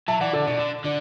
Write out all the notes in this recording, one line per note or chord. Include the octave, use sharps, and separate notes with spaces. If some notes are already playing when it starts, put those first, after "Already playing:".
F#3 E5 A5
E3 D5 F#5
D3 A4 D5
B2 D4
D3
D3 D4